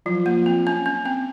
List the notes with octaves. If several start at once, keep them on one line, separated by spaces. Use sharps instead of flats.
F3 F#3
A#3
C4
C#4
C#4
C4